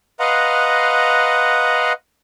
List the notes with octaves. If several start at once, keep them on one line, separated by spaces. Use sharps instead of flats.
B4 D#5 F5 F#5 A#5 C6